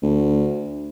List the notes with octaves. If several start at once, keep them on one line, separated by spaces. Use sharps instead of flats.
D2